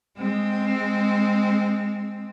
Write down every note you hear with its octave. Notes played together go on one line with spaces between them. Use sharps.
G#3 C4